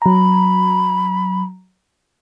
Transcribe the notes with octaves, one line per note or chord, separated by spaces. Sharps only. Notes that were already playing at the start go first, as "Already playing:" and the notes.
F#3 A#5 B5